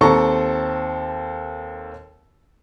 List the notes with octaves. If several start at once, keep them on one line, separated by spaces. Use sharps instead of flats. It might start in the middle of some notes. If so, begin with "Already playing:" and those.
D#2 C4 A4 A#5 C#6